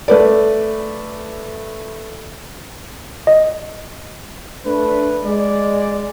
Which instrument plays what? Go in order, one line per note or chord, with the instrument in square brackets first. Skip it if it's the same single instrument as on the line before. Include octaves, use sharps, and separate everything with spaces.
[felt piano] A3 B4 D5
[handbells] D#5
[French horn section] A3 D4 [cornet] B4
[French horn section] G#3 [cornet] D5